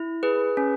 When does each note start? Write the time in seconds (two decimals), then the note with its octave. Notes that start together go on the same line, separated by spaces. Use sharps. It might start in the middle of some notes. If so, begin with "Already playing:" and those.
Already playing: E4
0.23 G#4 B4
0.57 C#4